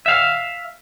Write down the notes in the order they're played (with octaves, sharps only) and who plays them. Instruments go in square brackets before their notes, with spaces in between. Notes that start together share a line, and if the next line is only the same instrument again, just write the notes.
[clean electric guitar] E5 F5